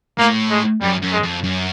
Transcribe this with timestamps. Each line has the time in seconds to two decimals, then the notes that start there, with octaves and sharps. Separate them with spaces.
0.18 A2 A#3
0.50 G#3
0.81 F#2 G3
1.02 F#2
1.12 G#3
1.23 F2
1.44 F#2